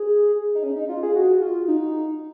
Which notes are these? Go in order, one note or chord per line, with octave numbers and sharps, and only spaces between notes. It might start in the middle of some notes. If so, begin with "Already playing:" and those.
Already playing: G#4
D#4
C#4
D#4
F4
G#4
F#4
F4
D#4